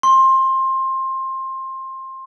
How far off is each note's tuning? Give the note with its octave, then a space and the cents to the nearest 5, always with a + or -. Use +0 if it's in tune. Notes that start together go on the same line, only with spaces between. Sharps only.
C6 +20